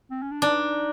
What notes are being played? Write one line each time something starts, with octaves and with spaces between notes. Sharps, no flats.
C4
C#4
D4
D4 D#4